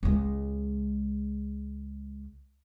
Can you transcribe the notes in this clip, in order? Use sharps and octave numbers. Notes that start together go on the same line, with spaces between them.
C#2 G#3